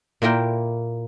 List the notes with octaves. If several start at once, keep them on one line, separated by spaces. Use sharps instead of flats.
A#2 A#3 E4 A#4 G5